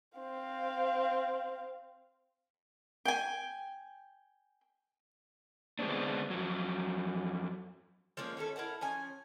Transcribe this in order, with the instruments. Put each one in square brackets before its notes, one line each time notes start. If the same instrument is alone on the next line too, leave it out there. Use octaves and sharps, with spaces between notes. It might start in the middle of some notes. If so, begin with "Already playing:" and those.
[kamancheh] C4 F5
[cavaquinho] G5 G#5
[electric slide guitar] D3 G#3 B3 C4 D4
F2 F#3
[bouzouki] F3 G#3 A#3 C#4
D#3 C#4 E4 A4
E4 A#4 F#5 A5
F3 C#4 G#5